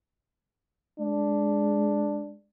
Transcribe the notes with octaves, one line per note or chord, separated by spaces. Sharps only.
G#3 D4